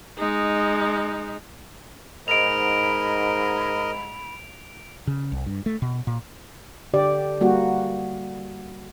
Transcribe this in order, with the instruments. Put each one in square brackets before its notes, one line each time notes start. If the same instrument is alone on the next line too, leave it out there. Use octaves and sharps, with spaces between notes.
[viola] G#3 D#4
[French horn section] G#2 [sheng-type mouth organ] A#4 D#5 [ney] B5 [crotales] D7 F7
[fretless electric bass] C#3
C2
G2
A3
B2
A#2
[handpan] D3 G4 D5
G3 A#3 F#4